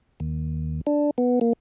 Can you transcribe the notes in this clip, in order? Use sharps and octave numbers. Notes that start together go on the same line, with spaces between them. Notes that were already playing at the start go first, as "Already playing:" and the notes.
D#2
D4
B3
A#3